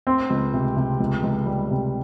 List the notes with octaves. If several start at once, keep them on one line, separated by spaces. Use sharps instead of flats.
C4
C#2
C3
C3
C#2
C#2
G3
C3